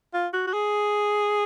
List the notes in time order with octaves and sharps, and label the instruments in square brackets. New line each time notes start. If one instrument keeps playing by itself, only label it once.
[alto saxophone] F4
F#4
F#4
G#4